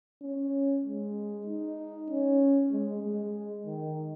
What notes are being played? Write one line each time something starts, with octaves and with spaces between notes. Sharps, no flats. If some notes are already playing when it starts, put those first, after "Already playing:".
C#4
G#3
D#4
C#4
G#3
G#3
D#3